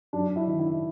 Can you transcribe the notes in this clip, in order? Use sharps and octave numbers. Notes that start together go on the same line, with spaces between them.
F#2 D4
E4
D#3
E4